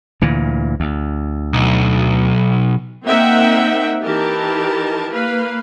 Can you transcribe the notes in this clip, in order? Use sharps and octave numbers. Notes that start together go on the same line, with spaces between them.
D2 A#2 E3
D2
B1
A#3 C4 D#4 E5 F#5 G5
E3 D#4 G4 A#4 A5
A#3 B4 F5